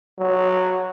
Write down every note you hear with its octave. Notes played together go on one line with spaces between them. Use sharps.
F#3